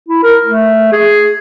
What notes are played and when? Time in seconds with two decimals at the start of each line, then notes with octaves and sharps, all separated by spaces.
0.09 E4
0.23 A#4
0.45 A3
0.92 G#4